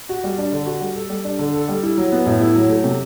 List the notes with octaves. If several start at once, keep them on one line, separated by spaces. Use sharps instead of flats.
F#4
G3
D4
D3
F#4
G3
A4
G3
D4
D3
A4
G3
E4
F#3
B3
A2
E4
F#3
A3
C3